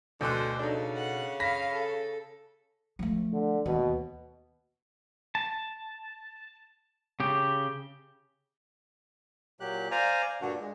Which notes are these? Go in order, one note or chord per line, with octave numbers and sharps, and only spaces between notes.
D2 B2 D3 C5 F#6
C#3 D4 D#4 A4
F#5
F5 B5 A#6 B6
A4
F3 A3
D3
D#2 B2
A5
C#3 G4
A#2 F#3 G4 F#6
C5 D5 F5 G#5 A#5
G2 A#2 D3 D4 F#4
G#3